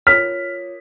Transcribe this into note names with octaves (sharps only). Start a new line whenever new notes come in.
F4 A#4 C#5 F6 B6